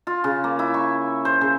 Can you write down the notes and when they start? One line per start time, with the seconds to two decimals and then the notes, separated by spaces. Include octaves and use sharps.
0.07 F4
0.24 C#3
0.44 A#3
0.59 E4
0.74 C#6
1.25 C5
1.41 C#3